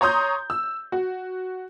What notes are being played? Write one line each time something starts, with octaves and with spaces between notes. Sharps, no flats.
C#5 A#5 C6 D#6 G6
E6
F#4